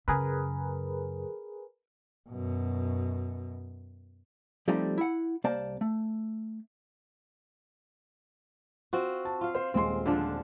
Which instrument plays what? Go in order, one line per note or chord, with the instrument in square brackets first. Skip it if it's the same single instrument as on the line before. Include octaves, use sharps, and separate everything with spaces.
[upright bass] F#2 C#3 [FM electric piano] G#4 A#4 B4
[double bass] F#2 B2
[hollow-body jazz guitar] F3 G3 A3 C4 D#4 G4
E4 F#5
C2 A#3 C5 D5 A5
A3
[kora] C4 F4 F#4
[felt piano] A5
[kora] F4 F5
[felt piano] C5
[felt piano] D#1 G#3 C6 [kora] C4
[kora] D3 F3 D4